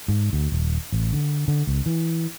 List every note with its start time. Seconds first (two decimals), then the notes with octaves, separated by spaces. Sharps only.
0.08 G#2
0.33 D2
0.52 D#1
0.93 A1
1.13 D3
1.48 D3
1.67 C#2
1.86 E3